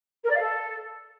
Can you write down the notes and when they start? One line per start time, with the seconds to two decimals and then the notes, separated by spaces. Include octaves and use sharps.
0.24 A#4
0.30 D5
0.35 F5
0.41 A4